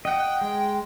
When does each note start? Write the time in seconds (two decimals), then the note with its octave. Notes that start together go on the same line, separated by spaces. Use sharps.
0.05 D#5 F#5 G5
0.41 G#3